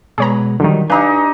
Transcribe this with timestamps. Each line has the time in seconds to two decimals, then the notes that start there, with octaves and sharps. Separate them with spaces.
0.18 B2 G#3 G#4 B4 C#5 A#5
0.60 D3 D#3 F#3 G3 D#4
0.90 D4 D#4 G4 B4 F5 G#5 A#5 F#6